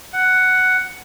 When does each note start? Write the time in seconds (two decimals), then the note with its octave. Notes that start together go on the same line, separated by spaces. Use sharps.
0.13 F#5